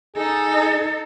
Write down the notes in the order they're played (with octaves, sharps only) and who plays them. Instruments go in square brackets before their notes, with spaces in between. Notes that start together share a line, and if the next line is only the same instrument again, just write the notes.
[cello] D#4 A4 [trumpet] G#4